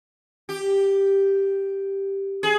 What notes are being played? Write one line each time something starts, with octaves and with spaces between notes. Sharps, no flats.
G4
G#4